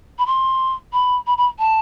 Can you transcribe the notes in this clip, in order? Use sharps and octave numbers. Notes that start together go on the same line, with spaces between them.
B5
C6
B5
B5
B5
A5